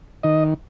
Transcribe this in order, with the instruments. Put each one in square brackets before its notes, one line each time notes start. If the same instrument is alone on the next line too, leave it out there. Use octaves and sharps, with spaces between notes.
[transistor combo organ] D#3 D#5